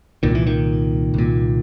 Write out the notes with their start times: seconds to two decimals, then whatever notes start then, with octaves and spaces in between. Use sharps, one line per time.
0.23 C2 A#2 D#3
0.35 E3
0.47 D#3
1.14 C2 A#2